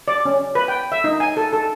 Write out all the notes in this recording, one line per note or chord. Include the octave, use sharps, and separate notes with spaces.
D5
C#4
B4
G5
E5
D#4
G#5
A4
A4